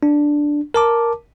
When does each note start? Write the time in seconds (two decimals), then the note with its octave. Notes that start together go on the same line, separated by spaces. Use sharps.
0.03 D4
0.74 A#4 A5 D6